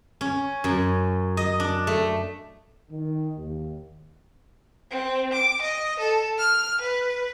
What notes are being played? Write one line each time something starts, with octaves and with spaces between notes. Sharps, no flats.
C#4
F#2
D#5
D4
A3
D#3
D#2
C4
D6
D#5
A4
F6
B4